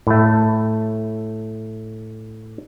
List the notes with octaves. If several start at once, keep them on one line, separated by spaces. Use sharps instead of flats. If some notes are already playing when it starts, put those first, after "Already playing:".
A2 A3